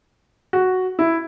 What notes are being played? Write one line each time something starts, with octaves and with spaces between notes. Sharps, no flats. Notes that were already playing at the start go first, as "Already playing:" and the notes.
F#4
E4